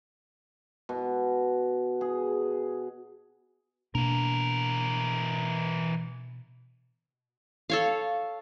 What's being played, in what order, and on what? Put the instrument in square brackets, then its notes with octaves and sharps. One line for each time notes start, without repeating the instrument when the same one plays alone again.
[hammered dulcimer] B2
G#4
[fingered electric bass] B2 A#3 D4 [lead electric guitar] E3 A#4
[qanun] A4 C#5 F5